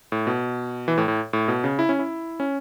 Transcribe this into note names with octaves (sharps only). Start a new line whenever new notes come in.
A2
B2
E3
A2
A2
A2
B2
C#3
E4
C#4
E4
C#4